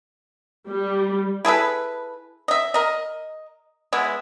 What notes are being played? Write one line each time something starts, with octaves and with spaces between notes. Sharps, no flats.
G3
E4 G#4 A4 B4
D#5 E5
A#4 D#5
G#3 B3 E4